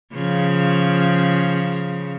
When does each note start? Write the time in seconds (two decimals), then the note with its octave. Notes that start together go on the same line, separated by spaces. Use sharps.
0.15 C#3 F3